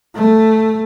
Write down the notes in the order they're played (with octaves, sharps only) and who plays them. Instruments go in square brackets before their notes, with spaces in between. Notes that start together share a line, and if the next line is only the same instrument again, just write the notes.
[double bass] A3